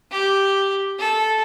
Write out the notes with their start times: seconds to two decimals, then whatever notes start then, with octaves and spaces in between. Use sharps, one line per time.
0.12 G4
0.99 A4